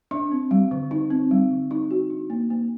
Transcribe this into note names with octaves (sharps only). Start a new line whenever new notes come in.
D4
C4
G3
D3
D#4
C4
G3
D3
D#4
F#4
D4
A#3
A#3